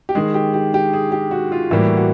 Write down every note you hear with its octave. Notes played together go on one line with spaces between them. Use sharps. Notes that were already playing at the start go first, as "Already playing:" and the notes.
G4
D#3 G#3 G#4
G4
G4
G4
G#4
G4
F#4
F4
A2 E3 G3 A#3 F#4
F#4